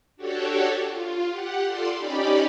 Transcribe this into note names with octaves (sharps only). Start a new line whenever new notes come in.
D4 F#4 G4 A4 C#5
F4
G4 F#5
F4 A4 D5 C6
C#4 D#4 G4 D5 B5